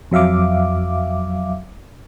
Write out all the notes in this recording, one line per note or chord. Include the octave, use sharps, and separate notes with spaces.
F2 F#3 E5 F5 D6